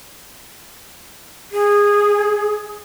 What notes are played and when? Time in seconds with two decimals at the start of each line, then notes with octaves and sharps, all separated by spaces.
1.52 G#4